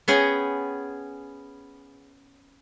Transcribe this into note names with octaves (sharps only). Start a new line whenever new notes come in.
B3 C#4 G#4 G5